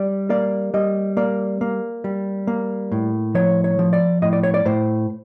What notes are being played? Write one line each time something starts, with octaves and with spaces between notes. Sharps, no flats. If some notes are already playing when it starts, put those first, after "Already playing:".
Already playing: G3 D5
A#3 D5
G3 D#5
A#3 D5
A#3
G3
A#3
A2
F3 C#5
C#5
F3
D5
A2 D#5
D5
C#5
D5
A2 C5